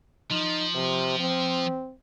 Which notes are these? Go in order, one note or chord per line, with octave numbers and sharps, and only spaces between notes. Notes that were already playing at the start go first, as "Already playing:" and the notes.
F3 D#4
C3
C4